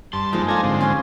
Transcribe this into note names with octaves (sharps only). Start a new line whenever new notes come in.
G2 A5 C6
F3 G#3 A#3 D#4 G#4
D4 F4 A4 G#5 A#5
G#2 D3 C4
C#4 D4 G#5